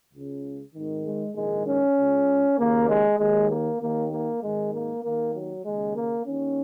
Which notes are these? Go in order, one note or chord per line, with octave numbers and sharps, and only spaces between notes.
C#2 C#3
G#1 G#2 D#3
G#3
A#1 G#2 D#3 G#3
C#4
C#2 C#3
D#2 C#3 A#3
G#3
D#2 D#3 G#3
A#3
D#2 D#3 A#3
A#3
G#1 G#2 D#3 G#3
A#3
D#2 D#3 A#3
F#3
D#2 C#3 G#3
A#3
D#2 D#3 C#4